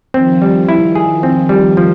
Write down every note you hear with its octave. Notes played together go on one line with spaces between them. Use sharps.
D#3 F3 C4
G3
E4
G#4
C4
G3
F3